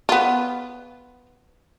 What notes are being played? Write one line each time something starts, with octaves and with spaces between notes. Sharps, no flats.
B3 F4